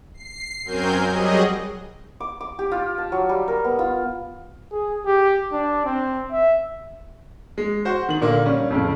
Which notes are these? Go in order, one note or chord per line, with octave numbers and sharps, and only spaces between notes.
C7
F#2 F#3 C4 A#4 G#5 G6
F#3 G3 G#4 D#5
D6
D6
G4
F4
A5
F#3
G3
A#4
B3
F4
G#4
G4
D4
C4
E5
G#3
F#4 C5
D#3 F#7
A#2 D3 A#3
G3 C#4
F2 A2 C#3